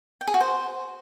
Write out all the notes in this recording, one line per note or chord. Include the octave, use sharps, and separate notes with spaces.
G5
G#4
F#4
C5